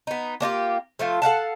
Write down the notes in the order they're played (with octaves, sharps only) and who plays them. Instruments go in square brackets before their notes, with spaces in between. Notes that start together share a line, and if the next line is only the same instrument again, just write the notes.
[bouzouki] B3 D#4
A#3 D4 F4 G4
F3 A3 F4
A4 F5 F#5 A5